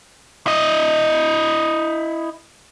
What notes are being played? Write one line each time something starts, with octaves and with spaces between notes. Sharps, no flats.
E4 D#5